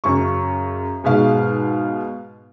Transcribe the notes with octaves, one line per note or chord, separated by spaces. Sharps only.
F#2 C#3 C#6
G#2 B2 G#3 F5